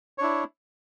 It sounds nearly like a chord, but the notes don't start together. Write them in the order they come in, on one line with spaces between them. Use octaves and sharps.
C#5 D4 E4